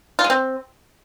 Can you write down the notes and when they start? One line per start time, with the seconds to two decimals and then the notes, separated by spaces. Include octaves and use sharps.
0.19 F4
0.24 G#3
0.30 C4